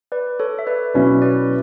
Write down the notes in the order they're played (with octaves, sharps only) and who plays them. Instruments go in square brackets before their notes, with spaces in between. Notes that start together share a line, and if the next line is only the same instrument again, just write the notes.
[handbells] B4 D5
A4 C#5
E5
B4 D5
[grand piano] B2 F#3 C#4 E4 [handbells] B4 D5
[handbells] B4 D5